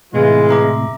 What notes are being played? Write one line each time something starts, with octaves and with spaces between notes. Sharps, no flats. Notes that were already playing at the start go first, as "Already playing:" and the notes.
A2 C3 E3 G#3 F4
E5 A#5 D6